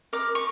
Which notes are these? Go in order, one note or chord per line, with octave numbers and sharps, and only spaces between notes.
A#4 D6
C#6